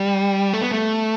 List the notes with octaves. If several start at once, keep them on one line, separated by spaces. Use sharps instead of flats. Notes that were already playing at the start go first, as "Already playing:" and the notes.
Already playing: G3
A3
B3
A3